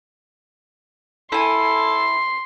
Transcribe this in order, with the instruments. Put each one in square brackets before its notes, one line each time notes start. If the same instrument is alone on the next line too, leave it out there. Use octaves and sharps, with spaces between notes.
[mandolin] E4 G#5 [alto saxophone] A4 [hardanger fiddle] C6